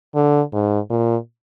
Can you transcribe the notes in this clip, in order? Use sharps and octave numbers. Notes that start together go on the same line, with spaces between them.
D3
G#2
A#2